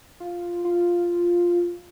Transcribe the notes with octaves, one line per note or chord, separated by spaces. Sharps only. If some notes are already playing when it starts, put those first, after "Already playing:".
F4
F4